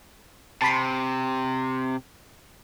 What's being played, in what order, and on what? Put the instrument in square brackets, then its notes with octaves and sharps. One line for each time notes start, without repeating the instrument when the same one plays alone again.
[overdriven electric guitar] C3 [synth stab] A5 B5 C6